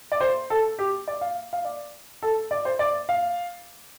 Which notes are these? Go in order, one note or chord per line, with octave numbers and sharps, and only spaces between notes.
D5
C5
A4
G4
D5
F5
F5
D5
A4
D5
C5
D5
F5